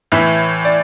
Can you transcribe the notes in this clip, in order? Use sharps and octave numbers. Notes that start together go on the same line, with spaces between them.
A2 E3 E5
D5